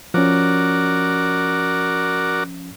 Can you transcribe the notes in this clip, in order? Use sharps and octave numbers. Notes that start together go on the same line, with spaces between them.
F3 C#4 F#4 A#4 D5